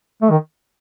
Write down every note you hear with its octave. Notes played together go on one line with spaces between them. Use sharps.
A3
D#3